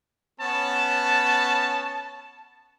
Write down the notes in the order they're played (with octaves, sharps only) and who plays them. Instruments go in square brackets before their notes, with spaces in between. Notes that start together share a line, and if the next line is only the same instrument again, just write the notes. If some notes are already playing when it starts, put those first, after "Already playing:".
[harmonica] B3 C#4 [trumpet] A5